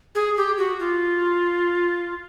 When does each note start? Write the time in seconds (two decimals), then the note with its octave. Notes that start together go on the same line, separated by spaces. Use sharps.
0.15 G#4
0.37 G4
0.58 F#4
0.80 F4